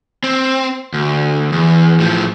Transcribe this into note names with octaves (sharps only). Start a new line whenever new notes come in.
C4
D2
E2
A2 F3